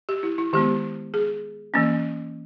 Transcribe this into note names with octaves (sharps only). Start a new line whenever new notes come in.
G4
E4
E4
D#3 G#3 B3 G4
G#4
E3 A#3 C#4